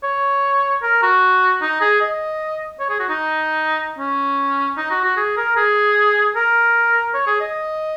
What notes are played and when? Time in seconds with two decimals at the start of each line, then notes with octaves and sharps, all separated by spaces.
0.03 C#5
0.83 A#4
1.03 F#4
1.62 D#4
1.81 G#4
2.01 D#5
2.80 C#5
2.90 G#4
2.99 F#4
3.09 D#4
3.98 C#4
4.77 D#4
4.91 F#4
5.04 F#4
5.17 G#4
5.37 A#4
5.57 G#4
6.36 A#4
7.14 C#5
7.27 G#4
7.41 D#5